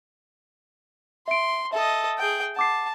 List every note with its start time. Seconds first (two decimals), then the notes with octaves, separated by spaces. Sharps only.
1.28 E5 C6 D7
1.73 A4 D#5 E5
2.19 G#4 G5
2.56 F#5 A5 D6 C7